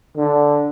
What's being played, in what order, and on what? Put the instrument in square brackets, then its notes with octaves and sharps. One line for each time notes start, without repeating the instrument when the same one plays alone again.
[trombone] D3